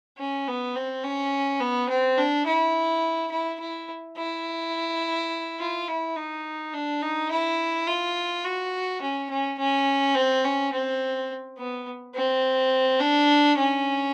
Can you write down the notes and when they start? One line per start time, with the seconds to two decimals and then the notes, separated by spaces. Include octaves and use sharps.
0.18 C#4
0.47 B3
0.75 C4
1.04 C#4
1.60 B3
1.89 C4
2.18 D4
2.46 E4
3.32 E4
3.60 E4
4.17 E4
5.59 F4
5.88 E4
6.17 D#4
6.74 D4
7.02 D#4
7.31 E4
7.88 F4
8.44 F#4
9.01 C#4
9.30 C#4
9.59 C#4
10.15 C4
10.44 C#4
10.73 C4
11.58 B3
12.15 C4
13.00 D4
13.58 C#4